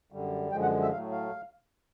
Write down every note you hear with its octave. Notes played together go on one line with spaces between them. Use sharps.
F#2 D3 G3
F#2 D3 F3 G#3 G5
F#5
E5
A2 F#3 A3 F5
F5